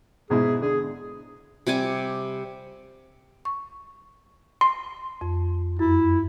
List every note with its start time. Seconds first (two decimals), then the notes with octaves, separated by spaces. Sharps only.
0.30 G#2 B2 E4 G#4
0.62 D3 G#4
1.67 C3 G3 G#5 D6
3.45 C#6
4.61 C6
5.21 F2
5.79 F#2 E4